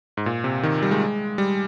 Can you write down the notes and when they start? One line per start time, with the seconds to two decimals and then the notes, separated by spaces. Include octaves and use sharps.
0.17 G#2
0.26 A#2
0.44 C3
0.63 D#3
0.82 G3
0.91 G#3
1.38 G3